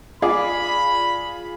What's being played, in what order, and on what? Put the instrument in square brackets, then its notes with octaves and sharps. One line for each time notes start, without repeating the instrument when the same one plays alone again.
[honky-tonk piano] F4 G#4 [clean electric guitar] D5 [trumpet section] B5